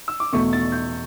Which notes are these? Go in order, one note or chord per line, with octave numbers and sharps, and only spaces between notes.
E6
D6
E2 B2 A3 C#6
A6
G6